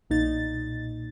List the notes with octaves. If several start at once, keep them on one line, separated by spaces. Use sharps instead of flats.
B1 A#2 D#4 A6